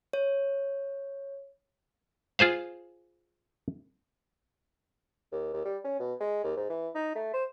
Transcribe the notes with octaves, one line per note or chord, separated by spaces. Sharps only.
C#5
F4 G#4 C5 F5
D#2
D#2
G3
C#4
B2
G#3
D#2
G#2
E3
D#4
A3
C5